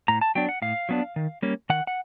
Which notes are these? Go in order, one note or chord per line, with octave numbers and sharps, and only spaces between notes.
A2 A#5
A5
F#3 B3 D4 G5
F#5
A2 F5
F#3 B3 D4
D#3
G3 A#3 C#4
D#3 F#5
F#5